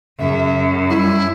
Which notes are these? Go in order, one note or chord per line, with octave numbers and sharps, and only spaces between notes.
F#2 C#3 E5
G3 E4